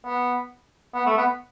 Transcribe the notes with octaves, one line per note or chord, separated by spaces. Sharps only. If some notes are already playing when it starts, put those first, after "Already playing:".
B3
B3
A3
B3